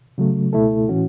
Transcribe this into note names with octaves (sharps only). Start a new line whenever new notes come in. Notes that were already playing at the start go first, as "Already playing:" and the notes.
C#3 F#3 A3
C#2 B2 A3 E4 A4
A2 E3 C#4 F#4